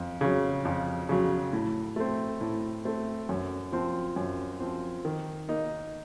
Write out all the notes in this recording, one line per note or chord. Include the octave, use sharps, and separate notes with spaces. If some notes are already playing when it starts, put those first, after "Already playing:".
Already playing: F2
C#3 F#3
F2
C#3 F#3
A2
A3 C4
A2
A3 C4
F#2
F3 C4
F#2
F3 C4
D#3
A#3 D#4